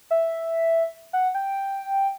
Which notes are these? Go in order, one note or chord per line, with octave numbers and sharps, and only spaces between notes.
E5
F#5
G5